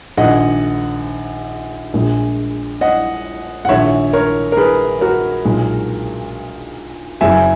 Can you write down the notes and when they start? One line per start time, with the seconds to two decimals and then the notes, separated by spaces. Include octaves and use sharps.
0.18 A#1 G#2 D#3 D#5 F#5
1.94 A#1 A#2 G#3
2.81 D#5 F#5
3.65 F#5
3.69 A#1 G#2 D#3 C#5 E5
4.13 A#4 C#5
4.52 A#4
4.57 G#4 B4
5.01 F#4 A#4
5.45 B1 A#2 G#3
7.21 F#1 F#2 C#3 F#3 E5 G#5